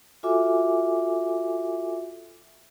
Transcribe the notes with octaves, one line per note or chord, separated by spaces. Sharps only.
F4 F#4 A4 E5 G#5 D6